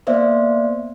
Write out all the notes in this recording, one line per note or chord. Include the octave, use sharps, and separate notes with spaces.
A#3 B3 C5 D5 E5 F5